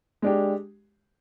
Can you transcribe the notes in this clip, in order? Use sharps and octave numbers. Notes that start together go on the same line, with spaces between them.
G#3 D4 G4